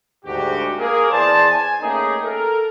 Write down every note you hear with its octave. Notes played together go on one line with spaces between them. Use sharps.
D2 G#2 F#4 G4
A#3 G#4 A#4
E2 G#4 C5 D5 A5
G#5
A3 A#3 C#4 D#4 G4 G#4
A4 A#4